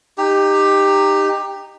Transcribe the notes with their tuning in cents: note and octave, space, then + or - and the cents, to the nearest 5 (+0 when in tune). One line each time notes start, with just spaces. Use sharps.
D#4 -15 G4 +15